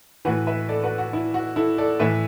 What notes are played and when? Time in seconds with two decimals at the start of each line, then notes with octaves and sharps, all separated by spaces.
0.25 A2 E3 F#4 B4
0.47 B4 E5
0.69 A4 D5
0.83 F#4 B4
0.98 F#4
1.13 E4
1.34 F#4
1.56 E4 A4
1.78 A4 D5
1.99 A2 E3 B4 E5